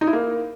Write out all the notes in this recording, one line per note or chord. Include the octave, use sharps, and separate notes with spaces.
D#4
E4
A#3